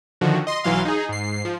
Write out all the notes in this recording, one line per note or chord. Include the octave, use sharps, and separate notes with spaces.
D3 D#3 F3 F#4
D#5 C6
B1 E3 F#3 F5 C6
D#4 G#4
G#2 C7
F3